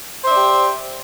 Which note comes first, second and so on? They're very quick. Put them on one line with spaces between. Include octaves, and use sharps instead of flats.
C5 E5 D5 G4